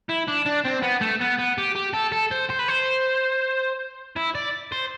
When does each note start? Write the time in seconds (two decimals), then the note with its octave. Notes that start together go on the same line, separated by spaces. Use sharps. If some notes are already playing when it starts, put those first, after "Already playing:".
0.10 E4
0.28 D4
0.46 D4
0.65 C4
0.83 B3
1.01 A3
1.20 B3
1.38 B3
1.58 G4
1.76 G4
1.94 A4
2.12 A4
2.31 C5
2.50 C5
2.59 B4
2.68 C5
4.17 E4
4.35 D5
4.72 C5